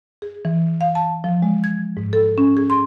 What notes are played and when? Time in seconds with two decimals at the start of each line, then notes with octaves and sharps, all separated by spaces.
0.22 G#4
0.45 E3
0.81 F5
0.95 A5
1.24 F3
1.42 G#3
1.64 G#6
1.97 G#2
2.13 A4
2.38 C#4
2.57 G#4
2.70 C6